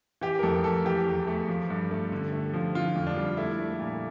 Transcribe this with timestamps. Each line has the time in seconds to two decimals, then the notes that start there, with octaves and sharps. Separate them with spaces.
0.21 E3 G4
0.39 A#4
0.43 F2 A4
0.64 A3 A4
0.85 E3 G4
1.06 E2
1.27 A3
1.49 F3
1.70 G2
1.91 A3
2.12 D3
2.32 A3
2.54 F3
2.75 D3 F4
2.96 F2
3.07 D4
3.17 G3
3.37 A3 E4
3.59 A3
3.80 A#2